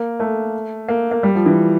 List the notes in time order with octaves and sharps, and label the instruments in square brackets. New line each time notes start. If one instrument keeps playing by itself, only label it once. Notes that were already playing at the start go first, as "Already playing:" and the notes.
Already playing: [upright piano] A#3
A3
A#3
A#3
G3
F3
E3